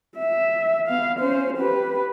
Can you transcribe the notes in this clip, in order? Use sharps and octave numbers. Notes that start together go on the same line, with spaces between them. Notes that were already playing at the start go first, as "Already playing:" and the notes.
E5
B3 F5
C#4 C5
G4 B4